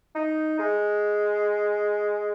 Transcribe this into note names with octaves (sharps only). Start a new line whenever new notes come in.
D#4
G#3